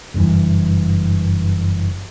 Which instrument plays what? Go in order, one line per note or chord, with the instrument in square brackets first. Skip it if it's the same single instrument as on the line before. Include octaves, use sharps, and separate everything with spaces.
[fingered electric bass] F#1 G2 C3 E3